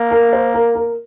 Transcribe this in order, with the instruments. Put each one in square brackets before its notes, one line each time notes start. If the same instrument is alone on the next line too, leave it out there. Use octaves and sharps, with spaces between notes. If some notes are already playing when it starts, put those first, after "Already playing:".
Already playing: [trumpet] A#3
[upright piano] A#4
C5
A#4
A#4